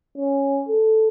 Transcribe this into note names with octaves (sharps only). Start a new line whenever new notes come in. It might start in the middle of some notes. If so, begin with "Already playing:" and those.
C#4
A4